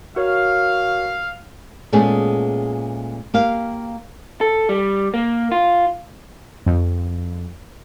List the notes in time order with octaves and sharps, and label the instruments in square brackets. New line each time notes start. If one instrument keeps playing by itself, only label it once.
[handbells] F#4 A#4 C#5 [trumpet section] F5
[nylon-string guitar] A#2 G#3 A3 B3 C#4 G#4
A#3 G4 F5
[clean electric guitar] A4
G3
A#3
F4
[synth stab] F2